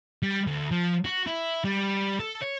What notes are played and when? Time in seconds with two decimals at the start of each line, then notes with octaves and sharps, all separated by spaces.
0.23 G3
0.47 D2
0.71 F3
1.05 F#4
1.27 E4
1.64 G3
2.20 A4
2.42 C#5